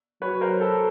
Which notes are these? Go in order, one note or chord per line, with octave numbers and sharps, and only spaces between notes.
F#3 B4 C#5
A#4 C5
A4 B4